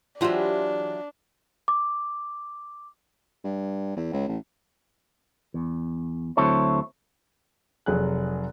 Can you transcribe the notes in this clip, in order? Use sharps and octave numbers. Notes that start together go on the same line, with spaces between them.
E3 F#3 D4 F4 G4 C5 E5
D6
G2
E2
C#2
A1
E2
D2 F#3 C4 E4 A4 C#5
F1 F#3 G#4 F#6